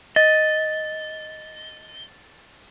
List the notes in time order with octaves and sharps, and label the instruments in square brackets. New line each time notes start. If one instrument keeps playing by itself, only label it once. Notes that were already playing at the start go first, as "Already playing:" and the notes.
[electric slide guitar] D#5 [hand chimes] A6